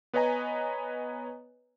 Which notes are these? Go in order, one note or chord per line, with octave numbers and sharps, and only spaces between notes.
B3 B4 C#5 D#5 G#5 A#5